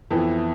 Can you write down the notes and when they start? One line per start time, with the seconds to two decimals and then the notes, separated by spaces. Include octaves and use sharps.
0.11 F2 E3 B3 E4